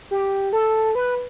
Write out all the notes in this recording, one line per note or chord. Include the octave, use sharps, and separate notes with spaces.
G4
A4
B4